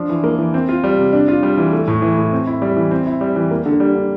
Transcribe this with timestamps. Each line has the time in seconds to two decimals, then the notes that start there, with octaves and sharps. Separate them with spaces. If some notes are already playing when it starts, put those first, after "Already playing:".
Already playing: F3 D4
0.09 E3
0.24 A#3
0.39 E3
0.54 C4
0.69 F4
0.84 G3
0.98 C3
1.13 D4
1.28 F4
1.43 G3
1.58 E3
1.72 A3
1.88 A2
2.02 E3
2.18 A2
2.32 C4
2.47 E4
2.62 G3
2.76 E3
2.91 C4
3.06 E4
3.21 G3
3.36 E3
3.51 A#3
3.66 D3
3.80 G3
3.95 D3